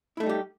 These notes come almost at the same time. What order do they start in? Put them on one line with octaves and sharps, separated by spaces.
E4 A3 D#4 G3 G4